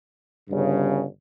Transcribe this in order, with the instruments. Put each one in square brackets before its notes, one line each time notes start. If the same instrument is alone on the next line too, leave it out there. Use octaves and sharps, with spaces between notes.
[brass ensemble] G1 G2 C#3